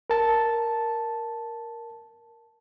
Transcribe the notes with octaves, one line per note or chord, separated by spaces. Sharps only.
A#4 A5